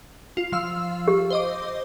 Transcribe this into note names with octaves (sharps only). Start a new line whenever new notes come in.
F4
F3 F5 E6
G4
C5 D#5 D6